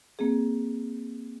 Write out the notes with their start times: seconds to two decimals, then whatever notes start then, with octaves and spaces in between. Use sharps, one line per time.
0.19 A#3 C4 G#4